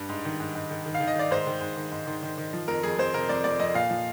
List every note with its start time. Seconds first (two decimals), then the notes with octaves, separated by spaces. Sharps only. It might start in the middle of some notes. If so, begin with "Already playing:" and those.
Already playing: G2
0.09 G#2
0.25 D#3
0.40 G#2
0.55 G#2
0.70 D#3
0.86 D#3
0.95 F5
1.00 D#3
1.07 D#5
1.16 D#3 D5
1.31 G#2 C5
1.47 D#3
1.61 G#2
1.76 D#3
1.92 G#2
2.07 D#3
2.23 D#3
2.38 D#3
2.53 F3
2.68 F2 A#4
2.83 F2 G#4
2.99 F2 C5
3.14 C3 A#4
3.29 F2 D5
3.44 F2 D5
3.60 F2 D#5
3.74 A#2 F5
3.90 F3